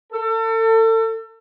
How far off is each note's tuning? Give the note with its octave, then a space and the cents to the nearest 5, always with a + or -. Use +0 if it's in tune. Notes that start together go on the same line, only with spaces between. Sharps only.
A4 +35